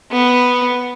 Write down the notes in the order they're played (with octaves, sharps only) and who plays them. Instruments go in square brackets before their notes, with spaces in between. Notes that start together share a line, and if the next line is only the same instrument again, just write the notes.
[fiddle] B3